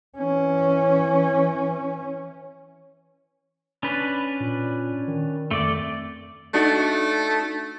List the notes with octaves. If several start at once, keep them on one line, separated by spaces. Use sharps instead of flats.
E3 C#4
C#4 D4 B4
A#2
D#3
F2 A3 D5
A3 D4 D#4 F#4